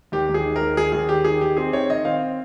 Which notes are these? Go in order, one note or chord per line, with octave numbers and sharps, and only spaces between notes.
D#2 G4
D#2
G#4
D#3
A#4
D#2
D#2 G#4
D#2 G#4
D#2 G4
D#3 G#4
D#3 G4
C4 G#4
D#3 C#5
D#3 D#5
C4 F5